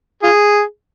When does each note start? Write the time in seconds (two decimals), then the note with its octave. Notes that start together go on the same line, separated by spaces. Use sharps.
0.23 F4 G#4